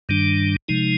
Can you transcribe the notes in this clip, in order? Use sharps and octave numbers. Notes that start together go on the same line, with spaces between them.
G2 D#3 G3 D4
C3 F3 G#3 D#4